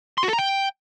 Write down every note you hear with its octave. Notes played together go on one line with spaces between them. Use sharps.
C6
F#4
A4
A#5
G5